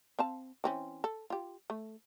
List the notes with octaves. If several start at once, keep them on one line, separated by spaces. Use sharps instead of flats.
C4 F5 A5
E3 C4 C#4
A4
F4 G4
A3